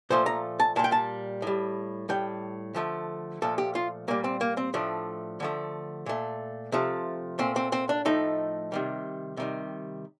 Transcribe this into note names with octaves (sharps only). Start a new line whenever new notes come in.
A#2 F3 A3 C5
A#5
A5
A#2 G3 A5
G5
A5
A2 G3
A2 G3 G5
D3 F3 A3
A#2 F3 A3 A4
G4
F4
A#2 G3 A#3
C4
A#3
C4
A2 F3 A3 D4
D3 F3 A3
A#2 A3
C3 F3 A3
A#2 A3 C4
C4
C4
D4
A2 F3 A3 D#4
C3 D#3 G3
C3 D#3 G3